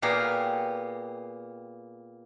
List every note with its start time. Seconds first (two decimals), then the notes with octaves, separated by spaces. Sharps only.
0.02 A#2 B3 G4 G#4 F5 A#5